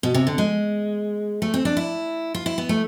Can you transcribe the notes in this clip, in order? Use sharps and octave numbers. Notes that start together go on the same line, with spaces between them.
B2
C3
D3
G#3
A3
C4
D4
E4
F4
E4
B3
A3